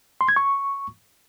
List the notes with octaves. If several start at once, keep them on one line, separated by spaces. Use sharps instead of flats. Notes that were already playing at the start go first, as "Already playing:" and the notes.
C6
G#6
C#6